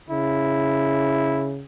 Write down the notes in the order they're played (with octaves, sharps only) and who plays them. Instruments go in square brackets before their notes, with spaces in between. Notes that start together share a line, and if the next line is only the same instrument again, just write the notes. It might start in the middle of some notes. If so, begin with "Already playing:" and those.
[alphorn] C#3 [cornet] E4